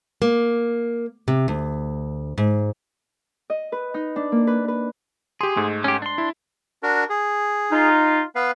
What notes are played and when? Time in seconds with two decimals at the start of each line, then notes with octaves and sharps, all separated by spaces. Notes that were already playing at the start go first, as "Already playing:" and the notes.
0.22 A#3
1.28 C3
1.48 D2
2.38 G#2
3.50 D#5
3.72 B4
3.94 D#4
4.16 D4
4.32 A#3
4.47 B4
4.68 B4
5.41 G4 G#4 C6
5.56 G#2 G#3 A3
5.84 C#4 G4
6.02 D4 C6
6.18 E4
6.83 D4 F#4 A#4
7.10 G#4
7.72 D#4 F4
8.35 B3 B4 F5